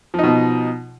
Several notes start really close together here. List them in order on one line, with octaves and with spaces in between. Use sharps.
F3 D#4 B2